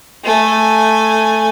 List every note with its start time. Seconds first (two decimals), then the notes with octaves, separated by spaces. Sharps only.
0.24 A3 G#5